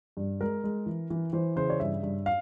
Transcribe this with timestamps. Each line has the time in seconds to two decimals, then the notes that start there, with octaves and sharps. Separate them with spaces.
0.17 G2
0.41 G#3 A#4
0.64 G#3
0.86 E3
1.10 E3
1.33 E3 C5
1.56 C#3 C5
1.70 C#5
1.80 G2 E5
2.03 G2
2.26 F5